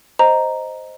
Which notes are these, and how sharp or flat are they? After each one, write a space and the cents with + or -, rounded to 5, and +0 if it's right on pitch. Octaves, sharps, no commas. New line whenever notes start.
C5 +0 D#5 +0 A#5 +0